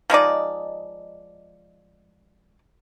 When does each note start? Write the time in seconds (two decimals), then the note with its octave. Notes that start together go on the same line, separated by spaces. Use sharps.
0.10 F3 G#3 D#4 D5